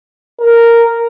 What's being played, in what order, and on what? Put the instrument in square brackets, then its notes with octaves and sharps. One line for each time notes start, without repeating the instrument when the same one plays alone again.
[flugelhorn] A#4